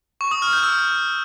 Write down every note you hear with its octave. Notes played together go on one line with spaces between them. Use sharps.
C#6
D#6
F6
G6
E6